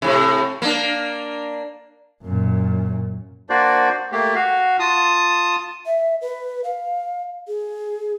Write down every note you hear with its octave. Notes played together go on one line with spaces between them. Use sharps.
A2 C3
A#3 D4
F#2 A#2
A#3 D4 F#4 C5 D5
A3 A#3 G4
F#4 F5
F4 A5 D#6
E5
B4
F5
G#4